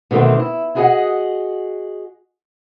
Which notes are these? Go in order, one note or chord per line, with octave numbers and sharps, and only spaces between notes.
B2 D3 D#3 A3 C4
E4
E4 F#4 G#4 A4 D#5 F#5